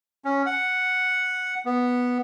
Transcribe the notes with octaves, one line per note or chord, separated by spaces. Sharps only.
C#4
F#5
B3